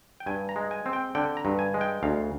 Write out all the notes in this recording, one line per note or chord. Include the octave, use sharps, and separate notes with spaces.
G5
G2 G#5
A#5
G#3
G#5
C4
G5
D3 G5
A#5
G2
G#5
G#3
G5
D2 F5